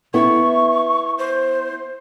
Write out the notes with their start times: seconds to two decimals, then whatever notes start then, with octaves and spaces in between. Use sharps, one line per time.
0.14 B3 E4 C#6
1.18 C5